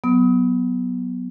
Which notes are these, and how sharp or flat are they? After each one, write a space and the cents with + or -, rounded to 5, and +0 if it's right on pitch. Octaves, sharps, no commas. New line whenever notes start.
F#3 +0 B3 +0 D#6 +35